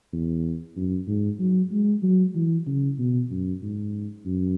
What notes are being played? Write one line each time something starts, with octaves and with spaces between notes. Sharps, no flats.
E2
F#2
G#2
F#3
G#3
F#3
E3
C#3
B2
F#2
G#2
F#2